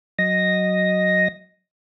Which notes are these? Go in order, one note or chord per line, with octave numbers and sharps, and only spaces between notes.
F#3 D#5 A#6